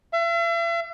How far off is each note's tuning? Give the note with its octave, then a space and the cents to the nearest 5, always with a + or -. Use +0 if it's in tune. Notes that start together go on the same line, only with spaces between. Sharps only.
E5 +40